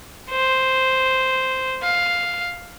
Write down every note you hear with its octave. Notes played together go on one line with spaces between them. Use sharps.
C5
F5